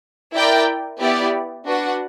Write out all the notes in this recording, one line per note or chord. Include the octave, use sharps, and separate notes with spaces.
E4 A#4 D5 G5
B3 E4 G4 B4 D5
D4 F#4 B4 F#5